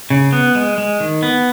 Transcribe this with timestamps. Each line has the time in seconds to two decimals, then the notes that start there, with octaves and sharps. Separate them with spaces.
0.10 C#3
0.32 B3
0.55 G#3
0.78 G#3
1.00 D#3
1.23 B3